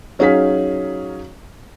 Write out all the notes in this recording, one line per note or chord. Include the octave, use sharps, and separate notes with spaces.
F#3 C#4 D#4 G#4 F5 B6